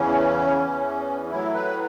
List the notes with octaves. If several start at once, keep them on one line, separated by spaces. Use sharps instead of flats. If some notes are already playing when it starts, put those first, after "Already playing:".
Already playing: E2 C#3 E3 C#4
E2 E3
A2 F#3 E4
B4